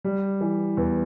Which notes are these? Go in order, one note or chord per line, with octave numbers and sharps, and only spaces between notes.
G3
E3
E2